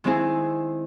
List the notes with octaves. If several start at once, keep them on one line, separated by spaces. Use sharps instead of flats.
D#3 G#3 C4 E4 G#4